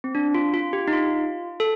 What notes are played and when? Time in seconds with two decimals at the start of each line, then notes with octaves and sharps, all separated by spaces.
0.04 C4
0.15 D4
0.34 F4
0.54 F4
0.73 G4
0.88 D#4
0.93 F4
1.60 A4